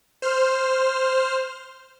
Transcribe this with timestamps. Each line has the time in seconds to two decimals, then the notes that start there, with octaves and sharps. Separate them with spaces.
0.22 C5 F6